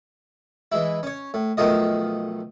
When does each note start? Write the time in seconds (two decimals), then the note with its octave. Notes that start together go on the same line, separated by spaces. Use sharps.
0.72 E3 G#3 E4
1.03 C#4 C#5
1.34 A2
1.57 B1 D#3 F3 A3 F4 D#5